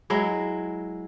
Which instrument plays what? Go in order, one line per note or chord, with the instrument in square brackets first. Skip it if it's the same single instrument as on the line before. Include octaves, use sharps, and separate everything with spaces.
[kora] F#3 G#3 E4